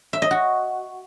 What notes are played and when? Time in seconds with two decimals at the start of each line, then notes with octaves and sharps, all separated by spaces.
0.13 E5
0.22 D#5
0.31 F#4